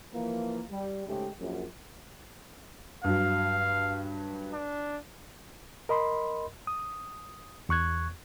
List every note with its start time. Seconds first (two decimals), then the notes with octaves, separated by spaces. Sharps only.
0.13 E3 F3 A#3
0.70 G3
1.07 G#2 C#3 G#3 A3 G4
1.39 A#1 F#2
3.04 G2 F#3 F5
4.53 D4
5.89 A#4 D#5 B5 C6
6.67 D#6
7.69 E2 C#6 F#6 G#6